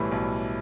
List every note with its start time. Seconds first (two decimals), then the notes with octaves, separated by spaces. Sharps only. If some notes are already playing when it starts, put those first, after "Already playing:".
Already playing: B1 A2 E3 G3
0.12 B1